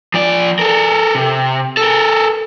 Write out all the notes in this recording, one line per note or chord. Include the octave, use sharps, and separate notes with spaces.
F3 D5
A4 A#4
C3
A4 A#4